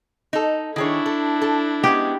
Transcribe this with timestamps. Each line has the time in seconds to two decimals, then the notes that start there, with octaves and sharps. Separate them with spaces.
0.33 D#4 A4
0.76 D#3 D4 E4 G#4 C#5
1.06 A4
1.42 A4
1.84 G#3 B3 C#4 G4